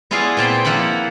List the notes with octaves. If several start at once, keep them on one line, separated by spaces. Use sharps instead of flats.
B3 E4 F4 G#4 D5 F5
A#2 C4 G5 B5
F3 A#3 E4 F#5 B5